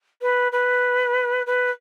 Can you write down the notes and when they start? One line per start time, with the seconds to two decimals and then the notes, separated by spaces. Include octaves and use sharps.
0.22 B4
0.52 B4
1.46 B4